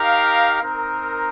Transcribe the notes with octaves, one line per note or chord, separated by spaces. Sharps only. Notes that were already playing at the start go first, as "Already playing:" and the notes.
Already playing: D#4 G4 A#4 F5
C4 D#4 A#4